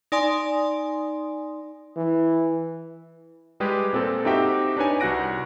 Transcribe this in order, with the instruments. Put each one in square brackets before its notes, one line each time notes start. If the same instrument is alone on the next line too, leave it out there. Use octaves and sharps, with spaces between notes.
[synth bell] D#4 D5 G#5 C6 D#6
[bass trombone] E3
[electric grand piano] G3 G#3 G4 G#4 B4
A#2 C4 A4 A#4
C4 D#4 F#4 G4 E5 G5
D4 D#4 B4 C#5 G#5
C2 F#4 F#5 F#6 A#6 D7